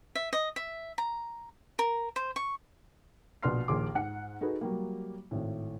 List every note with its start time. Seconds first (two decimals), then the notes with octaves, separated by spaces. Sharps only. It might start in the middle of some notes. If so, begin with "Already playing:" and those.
0.15 E5
0.33 D#5
0.56 E5
0.98 A#5
1.79 A#4
2.16 C5
2.36 C#6
3.43 A#1 B2 D5 C6 F6 C7
3.68 A#1 D#2 G#4 C6 D6
3.95 G#2 F#5 C#7
4.41 D#4 F#4 G#4 A4 B4
4.61 F#3 G3 A#3
5.31 G#1 A2